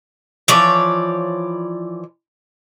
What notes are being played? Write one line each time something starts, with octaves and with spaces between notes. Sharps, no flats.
E3 F3 C#5 D5